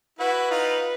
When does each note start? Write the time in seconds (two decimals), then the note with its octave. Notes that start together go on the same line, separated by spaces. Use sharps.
0.19 E4 F#4 B4
0.51 D#4 F4